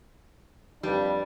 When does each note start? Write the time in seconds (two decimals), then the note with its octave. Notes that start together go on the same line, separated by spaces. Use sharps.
0.83 F2 G3 D4 B4